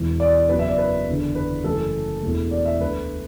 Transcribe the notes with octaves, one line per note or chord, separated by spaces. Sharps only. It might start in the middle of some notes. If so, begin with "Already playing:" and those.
Already playing: E1 E2 E3 B3
D5
F#1 F#2 F#3 B3 B4
E5
D5
B4
F#1 E2 D3
B4
F#1 F#2 E3 A3 A4
E1 E2 E3 A3
D5
E5
D2 D3 A3 B4